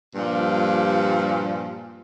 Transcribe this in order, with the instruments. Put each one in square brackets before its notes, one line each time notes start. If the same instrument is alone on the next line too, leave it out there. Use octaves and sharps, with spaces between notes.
[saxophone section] G2 A#2 F3 G3